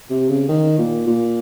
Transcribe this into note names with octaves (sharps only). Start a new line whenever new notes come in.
C3
C#3
D#3
A#2
A#2